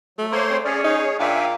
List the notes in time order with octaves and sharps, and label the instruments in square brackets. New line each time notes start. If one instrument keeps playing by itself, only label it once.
[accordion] F#3 [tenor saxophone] A3
[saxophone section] A#3 [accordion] C5 C#5 C6
[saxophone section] G3 G#3 C4
[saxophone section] C#4 [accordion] G#4 D5
[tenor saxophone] D#4 [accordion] G#4 C#5
[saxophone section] A#2 F5 [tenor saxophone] D4 [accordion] E5 G5 G#5